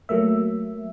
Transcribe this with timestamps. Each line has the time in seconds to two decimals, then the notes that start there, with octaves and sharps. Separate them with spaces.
0.09 F#3 A3 A#3 E5